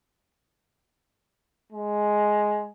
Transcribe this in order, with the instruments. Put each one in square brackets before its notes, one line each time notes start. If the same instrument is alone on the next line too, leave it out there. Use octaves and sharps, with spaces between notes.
[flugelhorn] G#3